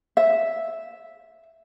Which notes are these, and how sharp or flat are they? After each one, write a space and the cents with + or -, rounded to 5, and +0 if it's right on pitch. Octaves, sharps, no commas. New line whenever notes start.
E5 -5